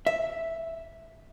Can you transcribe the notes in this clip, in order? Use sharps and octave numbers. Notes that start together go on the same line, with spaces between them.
E5